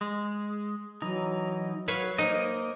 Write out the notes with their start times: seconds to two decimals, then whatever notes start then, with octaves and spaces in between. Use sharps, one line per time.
0.01 G#3
1.02 E3 F#3 D#4
1.88 F#3 B4 C#5 F5
2.18 A#3 D#4 C5 D#5